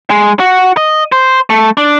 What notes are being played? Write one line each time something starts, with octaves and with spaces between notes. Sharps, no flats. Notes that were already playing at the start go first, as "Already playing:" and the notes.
G#3
F#4
D#5
C5
A3
D4